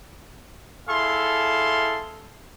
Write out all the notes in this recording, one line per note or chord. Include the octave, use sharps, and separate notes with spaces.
E4 G#4 A4 F5 C6